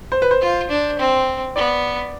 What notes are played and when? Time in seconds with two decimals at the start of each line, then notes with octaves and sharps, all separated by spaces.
0.12 C5
0.22 B4
0.31 C5
0.41 F4
0.69 D4
0.99 C4
1.56 B3 D5